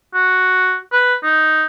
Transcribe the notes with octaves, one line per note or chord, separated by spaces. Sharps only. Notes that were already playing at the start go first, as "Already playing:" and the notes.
F#4
B4
D#4